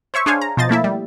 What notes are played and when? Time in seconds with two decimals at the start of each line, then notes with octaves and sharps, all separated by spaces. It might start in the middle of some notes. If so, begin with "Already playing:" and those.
0.14 C5 C#5 E5 C#6
0.26 D4 G#4 C5 C#5 F5 G#5
0.41 A#5
0.57 B2 F3 C5 D#5 A6
0.69 A3 A#3 E4 E5
0.84 G3